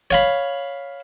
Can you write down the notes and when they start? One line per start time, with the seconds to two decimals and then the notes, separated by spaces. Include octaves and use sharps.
0.11 C#5 F5 B5